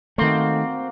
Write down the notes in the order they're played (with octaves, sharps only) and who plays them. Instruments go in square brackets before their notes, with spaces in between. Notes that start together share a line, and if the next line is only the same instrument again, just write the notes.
[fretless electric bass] D#3 A3 [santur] A#3 F#4 [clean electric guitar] C4 C5